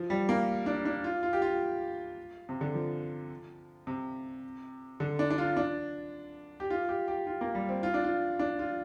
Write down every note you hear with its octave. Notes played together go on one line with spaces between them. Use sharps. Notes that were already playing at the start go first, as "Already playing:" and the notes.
Already playing: F3
G3
A#3
D4
D4
F4
F4
G4
F4
C3
D3
F3
C3
D3
D4
D4
F4
D4
G4
F4
G4
G4
F4
A#3
G3
C4
F4
D4
F4
D4
F4